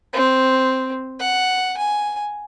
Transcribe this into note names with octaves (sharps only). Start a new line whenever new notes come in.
C4
F#5
G#5